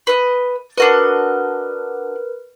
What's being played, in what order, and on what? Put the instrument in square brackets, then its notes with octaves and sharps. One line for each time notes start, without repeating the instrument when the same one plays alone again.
[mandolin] B4 D#5
[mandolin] D4 F#4 D#5 [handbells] A#4 B4